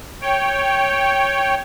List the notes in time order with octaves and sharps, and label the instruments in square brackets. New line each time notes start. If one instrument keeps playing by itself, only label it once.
[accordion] C#5 G5